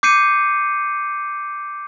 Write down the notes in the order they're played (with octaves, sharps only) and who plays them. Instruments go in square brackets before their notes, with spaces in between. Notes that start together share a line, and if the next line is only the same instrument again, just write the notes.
[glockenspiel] D6 G6 C7 C#7 D#7